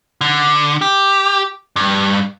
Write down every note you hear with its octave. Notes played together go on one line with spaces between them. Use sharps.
D3
G4
G2